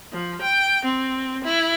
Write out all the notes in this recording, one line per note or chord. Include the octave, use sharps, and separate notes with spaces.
F3
G5
C4
E4